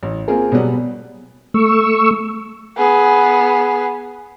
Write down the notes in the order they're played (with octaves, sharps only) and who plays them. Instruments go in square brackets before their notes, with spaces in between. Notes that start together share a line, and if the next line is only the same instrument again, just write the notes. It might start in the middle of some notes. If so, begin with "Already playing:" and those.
[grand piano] A1
A#3 C4 F4 G#4 A#4
B2 F#3 G3 B3
[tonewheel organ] A3 C#6 E6
[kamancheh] B3 G#4